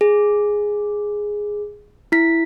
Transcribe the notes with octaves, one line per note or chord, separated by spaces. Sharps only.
G#4
E4 B6